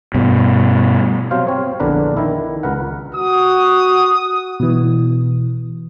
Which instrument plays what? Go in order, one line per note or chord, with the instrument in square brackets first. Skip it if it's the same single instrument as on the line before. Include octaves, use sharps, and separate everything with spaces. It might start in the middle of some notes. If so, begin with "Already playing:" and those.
[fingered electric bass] G2 B2
[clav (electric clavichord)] C3 F#3 C5 F5
C4 C#5
A#1 E2 D3 D4 A#4 B4
D#3 E4
C#2 A#4 B4 F#5
[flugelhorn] F#4 [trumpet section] D#6
[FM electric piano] B2 E3